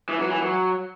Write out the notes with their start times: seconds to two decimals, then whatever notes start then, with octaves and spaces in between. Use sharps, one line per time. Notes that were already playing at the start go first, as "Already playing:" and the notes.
0.09 E3
0.20 F#3
0.31 E3
0.42 F#3